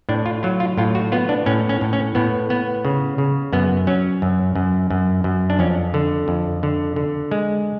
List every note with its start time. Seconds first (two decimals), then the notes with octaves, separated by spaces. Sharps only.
0.09 A2 D4
0.26 F4
0.43 F#3 F4
0.60 F4
0.78 A2 F4
0.95 F#4
1.12 B3 F4
1.29 D4
1.46 A2 C#4
1.69 C#4
1.81 A2
1.93 C#4
2.15 A2 B3
2.50 B3
2.85 C#3
3.18 C#3
3.53 F#2 B3
3.87 F#3 C#4
4.22 F#2
4.55 F#2
4.90 F#2
5.24 F#2
5.50 D4
5.59 F2 C#4
5.94 D3
6.28 F2
6.63 D3
6.96 D3
7.31 G#3